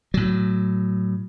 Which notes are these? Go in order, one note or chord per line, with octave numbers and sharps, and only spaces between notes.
A2 F#3